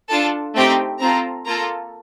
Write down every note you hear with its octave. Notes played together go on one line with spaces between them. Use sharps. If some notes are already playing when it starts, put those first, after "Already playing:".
D4 F4 A4 A5
A3 C4 D#4 G4 G5
C4 F4 A4 A#5
A#3 F4 A4 A#5